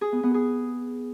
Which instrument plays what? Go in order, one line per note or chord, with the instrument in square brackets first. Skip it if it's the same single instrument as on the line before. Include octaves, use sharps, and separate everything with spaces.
[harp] G#4
B3
B3
G#4